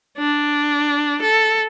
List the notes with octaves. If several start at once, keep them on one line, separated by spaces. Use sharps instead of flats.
D4
A4